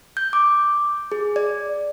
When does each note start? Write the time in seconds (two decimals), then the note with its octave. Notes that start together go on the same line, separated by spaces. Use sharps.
0.17 G6
0.33 D6
1.12 G#4
1.36 D5